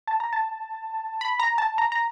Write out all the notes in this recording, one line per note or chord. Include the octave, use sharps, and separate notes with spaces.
A5
A#5
A5
B5
A#5
A5
A#5
A#5